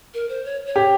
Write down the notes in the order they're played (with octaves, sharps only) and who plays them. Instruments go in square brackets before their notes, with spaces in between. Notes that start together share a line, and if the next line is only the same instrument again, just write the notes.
[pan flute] A#4
C5
C#5
C#5
[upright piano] G4